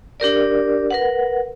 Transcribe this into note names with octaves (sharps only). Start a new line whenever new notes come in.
D4 G4 A#4 D5
A#4 B4 F#5